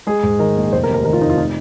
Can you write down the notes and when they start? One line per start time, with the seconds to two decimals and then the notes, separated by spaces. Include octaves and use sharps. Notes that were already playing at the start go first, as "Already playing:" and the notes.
0.07 G#3 G#4
0.23 G#2
0.39 D#3 A#4
0.56 A#1
0.72 F1 C5
0.83 A#4
0.89 D#2
0.94 A#4
1.05 D#3 A#4
1.13 F4
1.21 F1 D#4
1.30 F4
1.38 D#4